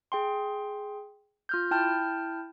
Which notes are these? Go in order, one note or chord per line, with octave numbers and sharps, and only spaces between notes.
G#4 G5 C6
F4 F6 G6
E4 G5 A5 F6 G6